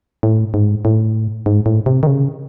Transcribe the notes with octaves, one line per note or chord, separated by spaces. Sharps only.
A2
G#2
A2
G#2
A2
C3
D#3
C#3